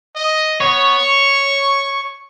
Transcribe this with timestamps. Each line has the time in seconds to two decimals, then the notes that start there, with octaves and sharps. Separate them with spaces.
0.15 D#5
0.60 B3 C#5
1.00 C#6